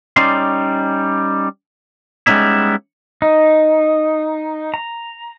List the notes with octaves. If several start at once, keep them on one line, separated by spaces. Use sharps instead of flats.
G3 C#4 D#4 D5 C6
G3 G#3 B3 C#4 D#4 E4
D#4
A#5